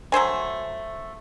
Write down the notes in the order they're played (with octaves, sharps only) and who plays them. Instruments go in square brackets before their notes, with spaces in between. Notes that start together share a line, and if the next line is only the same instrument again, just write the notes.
[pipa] F#3 A3 C5 G#5